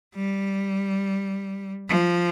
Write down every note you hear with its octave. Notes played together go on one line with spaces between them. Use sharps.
G3
F3